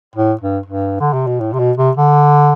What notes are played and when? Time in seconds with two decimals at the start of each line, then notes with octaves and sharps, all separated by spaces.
0.16 A2
0.41 G2
0.66 G2
1.00 D3
1.13 C3
1.27 B2
1.40 A2
1.53 C3
1.59 B2
1.78 C3
1.97 D3